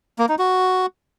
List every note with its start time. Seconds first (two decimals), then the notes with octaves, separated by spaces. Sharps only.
0.19 A#3
0.29 D#4
0.39 F#4